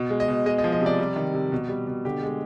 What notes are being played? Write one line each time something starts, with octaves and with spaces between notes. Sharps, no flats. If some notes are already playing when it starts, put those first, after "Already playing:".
Already playing: B2
G#3
D#5
B2
G#3 D#5
D#5
F3
D#5
C3
D5
G3
D#3
C3
B2
G3
B2
D3 G4
G#3